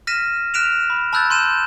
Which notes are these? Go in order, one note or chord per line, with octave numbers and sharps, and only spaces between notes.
F6 A#6 B6 D#7 E7
F6 F#6 B6 D7 E7 F7
B5
A5 B5 E6 F#6 G6 A6
C6 G6 D#7 E7